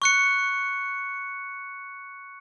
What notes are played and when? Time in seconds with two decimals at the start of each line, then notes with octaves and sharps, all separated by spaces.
0.02 C#6 F#6 C#7